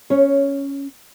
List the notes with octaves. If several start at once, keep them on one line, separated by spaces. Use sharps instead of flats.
C#4 C#5